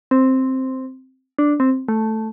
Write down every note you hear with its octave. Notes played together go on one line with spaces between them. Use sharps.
C4
D4
C4
A3